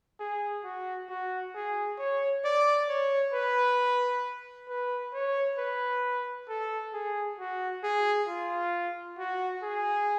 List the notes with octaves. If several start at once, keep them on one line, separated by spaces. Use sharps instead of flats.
G#4
F#4
F#4
G#4
C#5
D5
C#5
B4
B4
C#5
B4
A4
G#4
F#4
G#4
F4
F#4
G#4